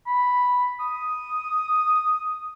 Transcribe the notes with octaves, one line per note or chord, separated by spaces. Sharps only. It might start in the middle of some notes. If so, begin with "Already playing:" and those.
B5
D#6